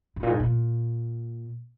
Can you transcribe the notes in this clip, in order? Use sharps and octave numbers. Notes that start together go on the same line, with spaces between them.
G#2
A#2
G#2
A#2